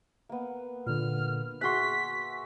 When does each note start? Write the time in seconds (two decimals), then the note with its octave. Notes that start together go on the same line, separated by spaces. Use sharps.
0.29 A#3 B3
0.87 A#2 D3 F6
1.61 F#4 G#4 E5 C6 F#6 B6